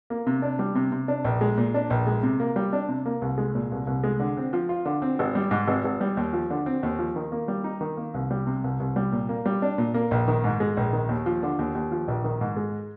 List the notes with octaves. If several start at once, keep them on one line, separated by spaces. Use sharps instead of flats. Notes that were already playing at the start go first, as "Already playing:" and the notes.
A#3
C3
D4
G3
C3
C3
D4
A#1
G#3
A#2
D4
A#1
G#3
C3
A#3
G3
D4
C3
A#3
C2
G#3
A#2
C2
C2
G#3
D3
C4
F3
F4
D3
C4
G#1
G3
G#2
G#1
G#1
G3
D#2
F3
D3
C4
D#2
F3
D#3
A#3
G3
D#4
D#3
A#3
C2
G3
C3
C2
C2
G3
A#2
A#3
G3
D4
A#2
A#3
A#1
D#3
G#2
G#3
A#1
D#3
D#2
F3
D3
D#2
D#2
F3
A#1
D#3
G#2
G#3